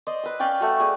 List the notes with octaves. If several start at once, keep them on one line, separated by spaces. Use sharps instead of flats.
C5 D5 D#5
B4 E6
C#4 D5 F5 G5
A3 F#4
G#4 D5